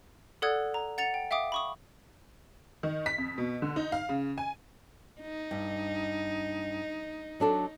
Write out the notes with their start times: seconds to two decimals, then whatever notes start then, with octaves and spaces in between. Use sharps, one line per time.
0.42 A4 D5 F#5 D#6 F#6 G#6
0.74 A#5
0.98 F#5 A6 C#7 F7
1.14 G5
1.31 E5 F5 G5 D6 D#6
1.52 B5 C#6 D#6
2.83 D#3
3.06 B6
3.18 F2
3.38 B2
3.62 D3
3.76 D#4
3.92 F5
4.09 C#3
4.38 G#5
5.21 D#4
5.51 G2
7.40 F#3 D4 A4